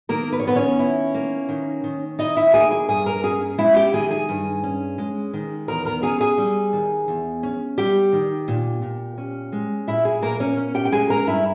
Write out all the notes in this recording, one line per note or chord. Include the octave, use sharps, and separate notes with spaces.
D#3 A#3 A#4
B4
C#5
D#3 B3 B4
C#4 C#5
E4
A#3
D#3
D#3
D#4 E4 D#5
E4 E5
A#3 G#4 G#5
G#4 G#5
G2 G#4 G#5
A#4 A#5
C#4 G#4 G#5
G#3 E4 E5
G4 G5
D#3 G#4 G#5
G#4 G#5
G2
C#4
G#3
D#3
E2 A#4 A#5
A#4 A#5
C#4 G#4 G#5
G#4 G#5
G3
D#3
E2
C#4
G3 G4 G5
D#3
A#2
A#2
C#4
G#3
A#2 E4 E5
G#4
A#2 A#3 A#4
C#4 C#5
C#4
G4 G5
G5
G#3 G#4 G#5
A#4 A#5
G2 E4 E5